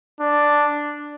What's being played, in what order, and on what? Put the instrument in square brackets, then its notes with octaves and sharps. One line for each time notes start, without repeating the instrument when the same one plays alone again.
[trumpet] D4